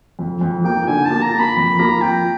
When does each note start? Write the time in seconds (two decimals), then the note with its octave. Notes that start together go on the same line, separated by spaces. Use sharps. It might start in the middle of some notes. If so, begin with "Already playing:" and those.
0.19 F2
0.41 F2
0.65 A#3 G5
0.87 D3 G#5
1.05 A5
1.11 A#3
1.22 A#5
1.34 A#3
1.39 B5
1.56 F2 B5
1.79 A#3 A#5
2.02 F3 G5